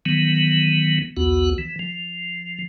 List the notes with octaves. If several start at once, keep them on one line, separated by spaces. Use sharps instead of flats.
D#3 E3 F#3 B3
B1 E2 B3 F#4
E3
F3